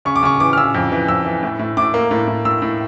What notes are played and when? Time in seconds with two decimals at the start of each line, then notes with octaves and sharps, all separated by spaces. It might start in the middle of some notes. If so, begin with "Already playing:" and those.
0.05 C#3 C#6
0.16 D6
0.23 C#3 C#6
0.40 E3 D6
0.53 F6
0.57 C#3 E6
0.75 F2
0.92 E3
1.08 F2 E6
1.25 E3
1.43 A2
1.59 A2
1.77 A2 D6
1.94 A#3
2.11 A2
2.27 A2
2.45 A2 E6
2.62 A2